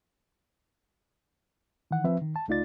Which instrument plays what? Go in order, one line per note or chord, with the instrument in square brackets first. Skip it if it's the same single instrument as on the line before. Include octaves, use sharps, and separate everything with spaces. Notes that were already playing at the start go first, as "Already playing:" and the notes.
[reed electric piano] D#3 E3 F#5
F3 C4 B4 E5
D#3
A5
C#2 A3 D#4 F4 D5 A6